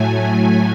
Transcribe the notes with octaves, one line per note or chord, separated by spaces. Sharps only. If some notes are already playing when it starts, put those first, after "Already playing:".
Already playing: A2 F#3 A3 G#5